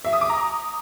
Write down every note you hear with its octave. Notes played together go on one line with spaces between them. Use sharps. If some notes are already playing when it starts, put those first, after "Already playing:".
E5
D#6
D6
A#5